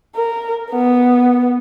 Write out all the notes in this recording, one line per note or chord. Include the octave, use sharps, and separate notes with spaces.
A#4
B3